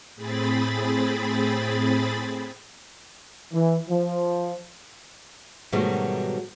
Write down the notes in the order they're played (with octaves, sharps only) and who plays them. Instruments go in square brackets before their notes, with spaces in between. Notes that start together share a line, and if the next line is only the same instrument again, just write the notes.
[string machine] A2 C4 G#4 B5 A6
[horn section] E3
F3
[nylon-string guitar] G#2 B2 D#3 F#3 G3 A3